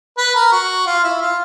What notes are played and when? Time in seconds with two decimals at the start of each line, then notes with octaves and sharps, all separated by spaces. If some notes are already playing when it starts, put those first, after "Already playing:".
0.18 B4
0.35 A#4
0.52 F#4
0.87 F4
1.04 E4
1.21 F4